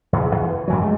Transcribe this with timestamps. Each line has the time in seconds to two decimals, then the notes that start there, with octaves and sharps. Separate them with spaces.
0.13 E2 C#3
0.32 E2
0.44 E3
0.68 F#2 E3 F#3
0.82 G#3 A3